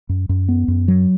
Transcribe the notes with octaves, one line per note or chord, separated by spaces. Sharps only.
F#2
F#2
B3
F#2
F#3